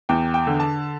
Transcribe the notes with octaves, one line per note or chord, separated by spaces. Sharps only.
E2 G5
G5
D3
A5